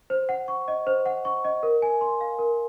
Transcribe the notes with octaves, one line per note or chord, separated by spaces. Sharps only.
C5
F#5
C#6
D#5
C5
F#5
C#6
D#5
A#4
G#5
C6
F5
A#4